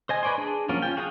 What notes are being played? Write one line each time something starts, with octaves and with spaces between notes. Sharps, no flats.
C5 D#5 G#5
B4 C#5 D5 G#5 C6
D4 G#4
F3 F#3 A#3 C#4 F4
C#4 F4 G5
F#4 G#4 F5 A5 D#6